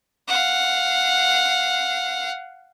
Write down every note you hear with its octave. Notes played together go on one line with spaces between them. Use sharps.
F5 F#5